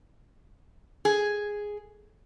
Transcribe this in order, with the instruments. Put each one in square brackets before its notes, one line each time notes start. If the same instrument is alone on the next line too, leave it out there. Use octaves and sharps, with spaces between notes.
[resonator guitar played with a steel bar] G#4